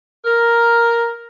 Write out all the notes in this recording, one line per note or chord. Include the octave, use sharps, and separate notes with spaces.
A#4